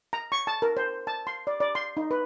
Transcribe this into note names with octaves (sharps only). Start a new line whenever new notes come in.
A#5
C#6
A5
A#4
C5
A5
C6
D5
D5
C6
D#4
B4